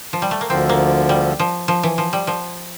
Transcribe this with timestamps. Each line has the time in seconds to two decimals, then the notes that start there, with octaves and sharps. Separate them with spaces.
0.13 F3
0.22 G3
0.31 A3
0.41 A#3
0.50 D2 D3 F3 C4
0.69 A#3
1.09 G3
1.39 F3
1.68 F3
1.83 E3
1.98 F3
2.13 G3
2.27 F3